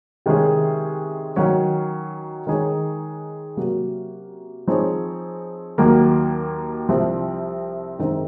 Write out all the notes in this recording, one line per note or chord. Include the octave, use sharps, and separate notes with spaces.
C3 D#3 G#3 C#4 G#4
D#3 F#3 C#4
D#3 G#3 D#4 G#4 C#5
C3 F#3 A#3 C#4 F#4
F3 C4 D#4 G#4 C#5
D#2 D#3 F#3 A#3
C2 C3 F3 C4
F#2 D#3 G#3 C4 D#4